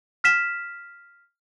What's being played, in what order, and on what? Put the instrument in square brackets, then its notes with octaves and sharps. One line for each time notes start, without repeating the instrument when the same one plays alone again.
[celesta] F6 B6 E7